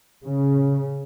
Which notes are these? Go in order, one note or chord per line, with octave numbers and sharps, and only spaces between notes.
C#3